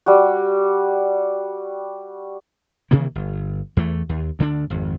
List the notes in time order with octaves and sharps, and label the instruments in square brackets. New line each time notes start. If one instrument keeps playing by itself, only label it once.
[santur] G3 F#4
[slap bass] C3 D#3 E3 A#3
G1
E2 E3 A3
D#2
D2 D3 G3 D4
G#1 F2